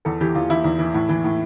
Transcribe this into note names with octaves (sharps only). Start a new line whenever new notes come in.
E2 A4
E3 G4
E2 F4
E3 E4
E2
E3
A2
E3
A2